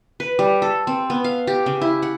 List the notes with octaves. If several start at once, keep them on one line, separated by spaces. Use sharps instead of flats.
B4
G3
A4
C4
B3
F5
G4
C#3
E4
F#5